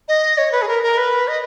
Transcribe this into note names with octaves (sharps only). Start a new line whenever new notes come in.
D#5
C#5
B4
G#4
A#4
A#4
B4
D#5